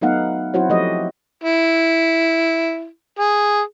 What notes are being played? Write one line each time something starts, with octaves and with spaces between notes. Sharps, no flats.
F#3 A3 B3 D#4 F5 F#5
F#3 C4 E4 F#4 C5 C#5
F3 A3 G4 D#5
E4
G#4